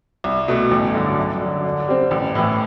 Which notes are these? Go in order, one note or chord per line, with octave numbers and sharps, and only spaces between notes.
C2
B2 A3
A1
G2 D3 F#3
F#2
D3 F#3
D3
G3 C4
A1
A2 E3